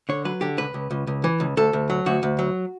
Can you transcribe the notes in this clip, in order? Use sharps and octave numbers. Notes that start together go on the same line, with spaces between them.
D3 C#5
F#3 B4
D3 G4
C#2 B4
C#2
C#2
C#2
E3
C#2
D2 A4
D2
F#3
D2 F#4
D2
F#3